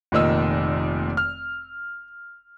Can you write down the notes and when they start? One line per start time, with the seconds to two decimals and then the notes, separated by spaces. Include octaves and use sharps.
0.12 F1 A#2 D#3 D#5 E6
1.17 F6